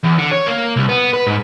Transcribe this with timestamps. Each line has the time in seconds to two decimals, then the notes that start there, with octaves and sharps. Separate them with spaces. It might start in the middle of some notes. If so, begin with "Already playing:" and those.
0.03 E2
0.18 D3
0.31 C#5
0.47 A#3
0.76 C2
0.89 B3
1.14 B4
1.27 G#2